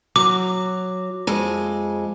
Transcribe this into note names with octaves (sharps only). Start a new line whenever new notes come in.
F#3 D6
F2 G#3